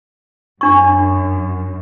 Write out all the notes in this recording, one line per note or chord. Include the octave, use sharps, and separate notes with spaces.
F#2 D4 C#6